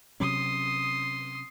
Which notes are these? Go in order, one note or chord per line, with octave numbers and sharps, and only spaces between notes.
C3 F#3 C#4 C6 D#6